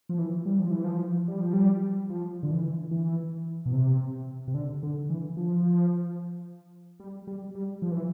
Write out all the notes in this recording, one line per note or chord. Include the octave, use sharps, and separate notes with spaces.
F3
E3
G3
F3
E3
F3
G3
F3
G3
F3
D3
E3
E3
B2
C3
C3
D3
D3
E3
F3
G3
G3
G3
F3
E3